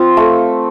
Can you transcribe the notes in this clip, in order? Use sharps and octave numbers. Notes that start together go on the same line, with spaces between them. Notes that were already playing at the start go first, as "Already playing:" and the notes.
Already playing: C4 F4
A3